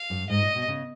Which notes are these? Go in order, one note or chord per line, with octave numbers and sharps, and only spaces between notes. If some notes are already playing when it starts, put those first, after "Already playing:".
Already playing: F5
F#2
G#2 D#5
A#2
B2
C#3